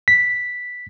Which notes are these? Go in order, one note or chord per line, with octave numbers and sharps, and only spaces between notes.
B6